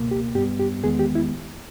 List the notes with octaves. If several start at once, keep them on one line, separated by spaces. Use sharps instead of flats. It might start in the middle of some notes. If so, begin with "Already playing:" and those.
Already playing: C#2 B2 A#3
G4
G2 G3 B3 G4
G4
E2 D#3 G#3 B3 G#4
G4
E4